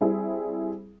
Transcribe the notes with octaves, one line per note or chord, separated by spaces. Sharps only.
G3 C4 E4 G#4